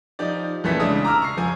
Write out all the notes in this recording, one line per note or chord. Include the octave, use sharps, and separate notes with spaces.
F3 D#4 G4 D5
A#1 E3 A3 C#4 B6
C#3 G#3 D4 D#6
A#5 D6 E6 F6
C#6 C7
F1 F3 G#5